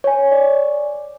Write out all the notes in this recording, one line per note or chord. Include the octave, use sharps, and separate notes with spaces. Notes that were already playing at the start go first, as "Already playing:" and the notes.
C#5 G#5
D5